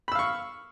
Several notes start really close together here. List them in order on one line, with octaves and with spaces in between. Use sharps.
B5 E6 F5 C#6